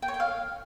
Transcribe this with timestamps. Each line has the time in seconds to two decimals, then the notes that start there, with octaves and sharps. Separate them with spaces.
0.02 G5
0.08 C#5
0.14 G5
0.20 F5